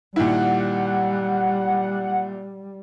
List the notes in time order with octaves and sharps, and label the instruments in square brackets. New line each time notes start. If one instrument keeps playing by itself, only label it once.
[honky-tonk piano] A#2 D#3 E4 [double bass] G3 [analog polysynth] F#5